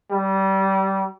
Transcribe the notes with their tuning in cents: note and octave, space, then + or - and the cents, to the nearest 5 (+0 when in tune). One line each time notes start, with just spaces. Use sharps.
G3 -25